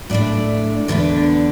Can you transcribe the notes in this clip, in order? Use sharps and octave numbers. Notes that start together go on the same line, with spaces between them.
A2 A3 D4 D5
E2 D3 B3 D4 D5